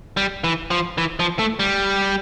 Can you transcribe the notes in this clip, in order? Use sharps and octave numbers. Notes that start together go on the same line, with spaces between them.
G3
E3
F3
E3
F3
A3
G3